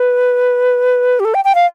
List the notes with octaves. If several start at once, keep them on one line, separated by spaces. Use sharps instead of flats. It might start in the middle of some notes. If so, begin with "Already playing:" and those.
Already playing: B4
G4
A4
G5
G5
F5